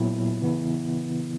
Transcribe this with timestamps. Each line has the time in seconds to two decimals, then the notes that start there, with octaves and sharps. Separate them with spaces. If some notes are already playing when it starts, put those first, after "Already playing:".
Already playing: A#2 F#3 B3 E4
0.41 C#3 E3 B3 E4